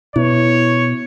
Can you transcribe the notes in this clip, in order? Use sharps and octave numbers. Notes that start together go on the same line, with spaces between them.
B2 E4 C#5